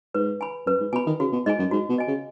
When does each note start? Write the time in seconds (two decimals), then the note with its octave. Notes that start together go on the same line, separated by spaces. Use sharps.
0.14 G#2 B4
0.41 G#5 B5
0.66 F#2 B4
0.80 G#2
0.93 B2 G#5
0.96 B5
1.06 D#3
1.20 C#3 F#4
1.32 B2
1.46 G#2 D#5 G#5
1.59 F#2
1.71 G#2 F#4
1.89 B2
1.98 D#5 G#5
2.07 C#3